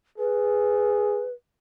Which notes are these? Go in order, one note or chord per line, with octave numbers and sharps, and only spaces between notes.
G#4 B4